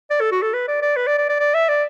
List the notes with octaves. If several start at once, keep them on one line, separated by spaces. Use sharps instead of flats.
D5
A4
F#4
A4
B4
D5
D5
B4
D5
D5
D5
D5
E5
D5